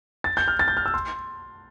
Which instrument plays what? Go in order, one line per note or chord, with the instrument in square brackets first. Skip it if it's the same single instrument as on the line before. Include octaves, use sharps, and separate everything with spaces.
[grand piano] A6
G6
F6
A6
G6
F6
E6
C6